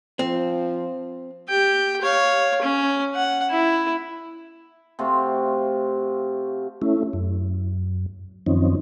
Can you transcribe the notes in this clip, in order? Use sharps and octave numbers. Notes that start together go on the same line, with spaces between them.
F3 C4
G4 G5
C#5 F5
C#4
F#5
E4
C3 A3 F4 F#4
A3 C#4 E4
F#2
F#2 D#3 F3 C4 C#4 D#4